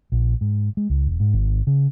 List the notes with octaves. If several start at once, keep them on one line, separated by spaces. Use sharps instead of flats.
A#1
G#2
G#3
C#2
E1
G#2
G#1
C#3